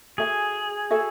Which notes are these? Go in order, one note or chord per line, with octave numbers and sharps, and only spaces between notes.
F#4 G#4 A4 E5 G#5
F#4 A4 E5 G#5